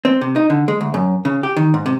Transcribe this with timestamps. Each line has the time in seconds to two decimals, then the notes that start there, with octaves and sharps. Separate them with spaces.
0.05 C4
0.21 C3
0.36 D#4
0.50 D3
0.68 G#3
0.81 D2
0.94 F#2
1.25 C#3
1.43 G4
1.56 D#3
1.74 G#2
1.86 C3